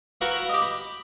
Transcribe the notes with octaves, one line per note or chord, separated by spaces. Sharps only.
E4 F#4 A#4 B4 F5 F#5
G4 D#5
B5